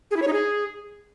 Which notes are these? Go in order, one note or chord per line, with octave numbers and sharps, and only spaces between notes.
G#4
E4
C#5
D#4
G#4